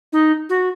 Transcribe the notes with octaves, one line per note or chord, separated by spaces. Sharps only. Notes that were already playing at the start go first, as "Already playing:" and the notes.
D#4
F#4